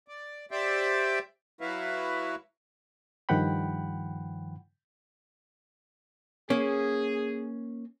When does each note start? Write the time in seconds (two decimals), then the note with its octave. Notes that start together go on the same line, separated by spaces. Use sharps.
0.08 D5
0.51 G4 C5 D5 E5 G5
1.61 F#3 E4 F#4 B4 E5 F5
3.29 G2 D#3 F3 F#5 G5 B5
6.50 A#3 C#4 G#4